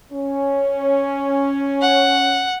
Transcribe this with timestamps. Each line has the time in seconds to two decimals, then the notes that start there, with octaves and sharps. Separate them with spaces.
0.13 C#4
1.81 F#5